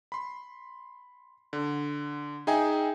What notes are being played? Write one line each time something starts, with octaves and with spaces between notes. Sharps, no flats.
B5 C6
D3
D#4 G#4 E5 G5 G#5